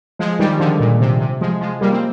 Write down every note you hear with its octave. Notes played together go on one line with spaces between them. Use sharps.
F3 G#3
D#3 G3
D3 F3
A#2
C3
C3
F3 G#3
F3 G#3
G3 A#3
C4